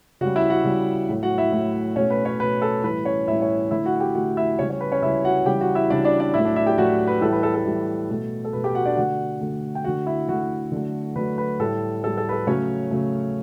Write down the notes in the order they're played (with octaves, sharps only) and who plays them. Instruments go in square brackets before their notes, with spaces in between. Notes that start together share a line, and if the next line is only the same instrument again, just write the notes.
[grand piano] C#3 G3 F#4 F#5
E4 E5
F#4 F#5
C#3 G3
A2 F#3 A3
F#4 F#5
E4 E5
A2 F#3 A3
B2 A3 C#4 C#5
B4
C#4 C#5
B2 A3 B4
A4
A2 E3 G3 B4
C#4 C#5
A2 E3 G3 E4 E5
C#4 C#5
D3 A3 E4 E5
F#4 F#5
F#5
G4 G5
D3 A3 F#4 F#5
E4 E5
C#3 G3 C#4 C#5
C#4 C#5
B4
C#4 C#5
C#3 G3 E4 E5
F#4 F#5
C#3 E3 G3 G4 G5
F#4 F#5
E4 E5
C#3 E3 G3 D4 D5
D4 D5
D4 D5
A2 F#3 A3 E4 E5
D4 D5
E4 E5
G4 G5
A2 F#3 A3 F#4 F#5
B4
A2 E3 G3 A4
B4
A4
A4
A2 E3 G3
B2 A3
A4
B2 A3 B4
G4 G5
F#4 F#5
D4 D5
D3 A3 F#4 F#5
D3 A3
G5
D3 A3 F#4 F#5
E4 E5
D3 A3 F#4 F#5
D3 F#3 A3
D3 F#3 A3 B4
B4
A2 G3 A4
A2 G3 A4
A4
B4
A4
C#3 F#3 A3 C#4 C#5
C#3 F#3 A3